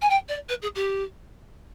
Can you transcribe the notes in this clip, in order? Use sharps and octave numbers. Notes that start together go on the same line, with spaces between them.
G#5
G5
D5
B4
G#4
G4